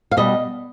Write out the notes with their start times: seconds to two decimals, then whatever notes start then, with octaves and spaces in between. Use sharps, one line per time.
0.11 F5
0.17 B2 G3 D#5